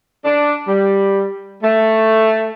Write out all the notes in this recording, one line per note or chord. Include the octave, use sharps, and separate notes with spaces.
D4
G3
A3